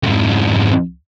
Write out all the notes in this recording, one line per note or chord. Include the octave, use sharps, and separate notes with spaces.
F2 G#2